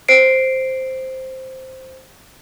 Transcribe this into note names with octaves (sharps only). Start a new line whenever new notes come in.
C5 C7 D7